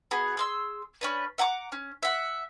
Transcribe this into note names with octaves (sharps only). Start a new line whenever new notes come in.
B3 F#4 G#4
G#4 C6 E6
C#4 D4 B4
E5 F#5 A#5 D6
C#4
E5 F#5